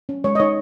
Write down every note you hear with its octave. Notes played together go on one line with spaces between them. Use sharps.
C#4
G#3 C#5
D#5
D#4 C#5